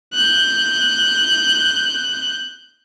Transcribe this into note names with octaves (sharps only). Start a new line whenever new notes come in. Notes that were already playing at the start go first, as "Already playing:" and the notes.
F#6 G6